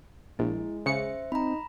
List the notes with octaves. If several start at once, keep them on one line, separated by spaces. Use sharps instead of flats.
A#1 G#3 E4
C#3 C5 E5 C#7
C4 D#4 A#5 B5